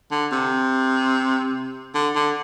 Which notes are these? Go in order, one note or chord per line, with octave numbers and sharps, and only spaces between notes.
D3
C3
D3
D3